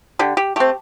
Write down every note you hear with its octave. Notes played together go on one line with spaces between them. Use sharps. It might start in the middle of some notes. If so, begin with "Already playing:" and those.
D3 G4
G4
A3 C4 G4